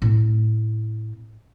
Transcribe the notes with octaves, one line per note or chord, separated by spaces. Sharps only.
A2 C4